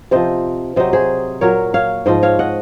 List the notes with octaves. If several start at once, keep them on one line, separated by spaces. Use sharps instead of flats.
C3 F3 C5 D#5
C3 F#3 C5 D#5
G#4 C5
A#2 F#3 A#4 C#5
C#5 F5
G#2 F3 C5 D#5
C#5 F5
D#5 F#5